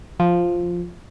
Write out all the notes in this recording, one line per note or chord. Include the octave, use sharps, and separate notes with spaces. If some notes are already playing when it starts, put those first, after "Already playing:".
F3